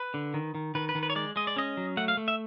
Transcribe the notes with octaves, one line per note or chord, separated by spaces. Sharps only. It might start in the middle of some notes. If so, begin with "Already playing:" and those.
Already playing: B4
D3
D#3
D#3
D#3 B4
B4
D#3
B4
C#5
G#3 D5
G#3 D#5
D5
C#4 D#5
F#3
A3 F#5
F5
A3
E5